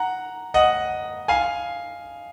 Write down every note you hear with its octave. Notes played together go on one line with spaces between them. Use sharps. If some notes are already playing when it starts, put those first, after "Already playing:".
Already playing: F#5 A#5
D#5 F#5
F5 G#5